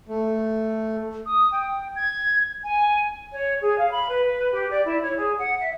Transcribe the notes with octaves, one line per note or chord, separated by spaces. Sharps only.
A3
D#6
G5
G#6
G#5
C#5
G#4
F5
B5
B4
G4
D5
E4
C#5
G#4
F#5
E5